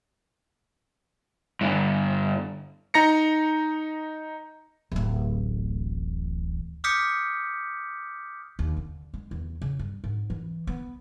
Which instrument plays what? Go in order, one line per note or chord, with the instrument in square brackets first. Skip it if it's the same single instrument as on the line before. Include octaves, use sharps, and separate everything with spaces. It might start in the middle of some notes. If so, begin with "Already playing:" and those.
[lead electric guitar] G2 D3
[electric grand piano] D#4 A#5 A#6 C#7
[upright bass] D1 A1
[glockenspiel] D6 D#6 F6 G6 B6 C#7
[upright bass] D#2
D3
G#3
E2
C#3
G2
G#2
E3
B3